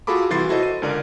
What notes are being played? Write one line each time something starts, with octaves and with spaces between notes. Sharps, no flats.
F4 F#4 G#4 A4 B5 D6
C2 E3 F#4 C6 A6 C7
E4 F#4 A4 C5 D#5
D#7
C#2 D3 A#4 D5